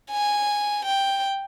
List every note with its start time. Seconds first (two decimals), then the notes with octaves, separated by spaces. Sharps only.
0.11 G#5
0.85 G5